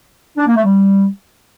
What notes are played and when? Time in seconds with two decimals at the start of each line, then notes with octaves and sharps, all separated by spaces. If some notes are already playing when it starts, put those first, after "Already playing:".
0.37 D4
0.47 A#3
0.56 A3
0.65 G3